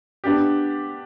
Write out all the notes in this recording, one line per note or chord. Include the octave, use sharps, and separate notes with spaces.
B3 D4 G4